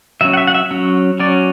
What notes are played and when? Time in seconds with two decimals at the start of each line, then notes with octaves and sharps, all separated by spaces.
0.21 F#3 C#4 E5
0.34 F#5
0.37 E5
0.47 F#5
0.54 E5
0.71 F#3 C#4
1.20 F#3 C#4 D5